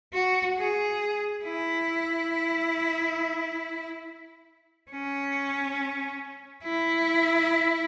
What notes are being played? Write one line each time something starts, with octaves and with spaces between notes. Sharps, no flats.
F#4
G#4
E4
C#4
E4